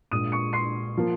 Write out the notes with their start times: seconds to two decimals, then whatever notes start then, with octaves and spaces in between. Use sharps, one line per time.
0.11 A#1 A#2 G#3 D#6 D#7
0.32 C#6 C#7
0.53 C6 C7
0.97 F3 A#3